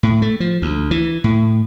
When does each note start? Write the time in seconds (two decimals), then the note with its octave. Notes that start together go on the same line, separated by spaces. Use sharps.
0.03 A2
0.22 A3
0.40 F3
0.62 D2
0.91 E3
1.24 A2